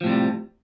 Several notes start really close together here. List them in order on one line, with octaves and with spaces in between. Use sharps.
F3 A2 C3 G3